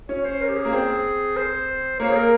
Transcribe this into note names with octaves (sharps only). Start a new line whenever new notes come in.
C#4 C#5
C5
A#4
G4
G#4
A#3
C4
C5
A#3 C#5
G#4
A#4